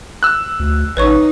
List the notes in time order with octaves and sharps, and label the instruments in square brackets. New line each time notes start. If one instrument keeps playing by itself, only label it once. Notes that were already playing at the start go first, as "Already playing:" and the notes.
[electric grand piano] E6 F#6
[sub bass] D2
[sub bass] A1 [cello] D#4 [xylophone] B4 C#5 C#6